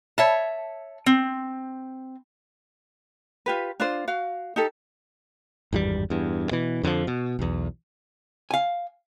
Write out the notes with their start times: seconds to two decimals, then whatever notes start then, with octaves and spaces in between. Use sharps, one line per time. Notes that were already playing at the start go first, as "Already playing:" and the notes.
0.18 C#5 E5 A5
1.06 C4
3.46 F4 G4 B4
3.80 D4 F4 C5
4.08 F#4 F5
4.56 D#4 G4 A4
5.73 G#1 E2 G2 G3
6.10 E2 G2
6.51 B2 E3
6.83 F2 D3 D#3 F3
7.07 B2
7.39 B1 E2
8.51 F5 G#5